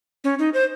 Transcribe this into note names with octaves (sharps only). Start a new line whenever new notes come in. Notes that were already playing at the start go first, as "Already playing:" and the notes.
C#4
D#4
C5